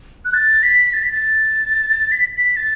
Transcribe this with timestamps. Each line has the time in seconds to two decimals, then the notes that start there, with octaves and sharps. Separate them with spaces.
0.25 F#6
0.34 A6
0.63 B6
0.93 A6
1.03 B6
1.12 A6
2.12 B6
2.37 B6
2.56 A6